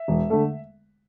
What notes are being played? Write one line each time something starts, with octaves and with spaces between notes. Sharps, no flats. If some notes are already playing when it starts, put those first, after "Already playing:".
Already playing: E5
E1
D3 A3